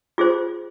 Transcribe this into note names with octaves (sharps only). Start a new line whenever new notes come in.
F4 G#4 C5